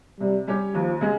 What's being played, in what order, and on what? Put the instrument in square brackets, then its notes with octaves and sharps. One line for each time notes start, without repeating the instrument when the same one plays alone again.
[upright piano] C3 [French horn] G3
[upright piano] G3 C#4 G4
[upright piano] D#2 [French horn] F3
[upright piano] C#3 G#3